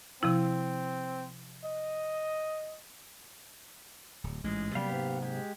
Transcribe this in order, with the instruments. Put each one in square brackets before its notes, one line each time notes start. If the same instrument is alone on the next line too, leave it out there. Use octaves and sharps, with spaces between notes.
[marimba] C3 F3 E4 [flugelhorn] C4
[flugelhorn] D#5
[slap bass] D1
[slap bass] A1 G#2 [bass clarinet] G#3
[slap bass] C3 F#3 A#3 [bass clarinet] G3 [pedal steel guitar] B3 G4 F5
[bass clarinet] G#2
[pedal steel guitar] G#3 G4